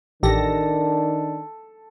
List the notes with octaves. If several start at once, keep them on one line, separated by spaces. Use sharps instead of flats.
A1 D#3 D4 G4 A4 A#6